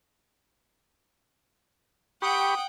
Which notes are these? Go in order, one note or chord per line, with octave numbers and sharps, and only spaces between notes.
G4 F#5 G5 B5 C#6 D#6